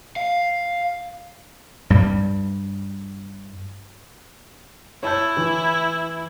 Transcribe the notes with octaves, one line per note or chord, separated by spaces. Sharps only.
F5
G2 G3
E4 C#5 A5 G6
E3